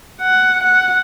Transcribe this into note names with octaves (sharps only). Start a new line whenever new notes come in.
F#5
F#5